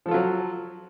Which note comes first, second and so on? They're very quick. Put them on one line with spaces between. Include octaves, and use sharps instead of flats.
F3 A4 F4 F#3